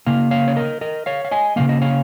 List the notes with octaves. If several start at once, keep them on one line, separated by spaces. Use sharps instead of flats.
C#3 A#3 F5
C#5 F5
C#5
A#4 D#5
A#4 D#5
C#5 F5
F5
D#5 G#5
C#3 F3 A#3 F5
D#5
C#5 F5